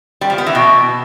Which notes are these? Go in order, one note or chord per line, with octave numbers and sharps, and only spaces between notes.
G3
F3
B3
E3
B2